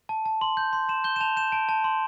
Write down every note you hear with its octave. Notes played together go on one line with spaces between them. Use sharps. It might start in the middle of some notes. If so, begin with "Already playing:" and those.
A5
A5
C6
G6
C6
C6 E7
G6 G7
E7
A5 F7
G6 E7
A5 D7
A5
C6